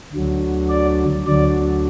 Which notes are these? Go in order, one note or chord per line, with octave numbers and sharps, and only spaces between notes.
D2 D3 F#3
D5
D2 D3 F#3 D5